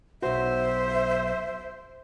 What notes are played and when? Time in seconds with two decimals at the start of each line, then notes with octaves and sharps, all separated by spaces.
0.22 B1 F#4 C5 E5